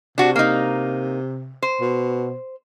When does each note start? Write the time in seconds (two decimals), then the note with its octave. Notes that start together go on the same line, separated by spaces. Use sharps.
0.18 C3 D4 F#4
0.36 A#3 D#4
1.62 C5
1.80 B2